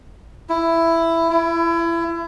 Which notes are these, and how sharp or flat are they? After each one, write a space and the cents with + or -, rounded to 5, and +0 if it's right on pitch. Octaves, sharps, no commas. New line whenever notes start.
E4 +10
E4 +30